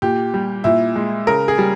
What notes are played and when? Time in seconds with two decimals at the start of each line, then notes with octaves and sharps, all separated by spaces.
0.02 A#2 G4
0.34 G3
0.64 A#2 E4
0.96 G#3
1.27 C#3 A#4
1.48 G#4
1.58 G3